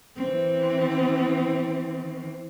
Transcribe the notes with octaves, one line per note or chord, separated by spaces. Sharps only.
E3 C4